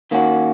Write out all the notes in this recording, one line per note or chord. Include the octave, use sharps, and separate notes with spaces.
D#3 A#3 C#4 F#4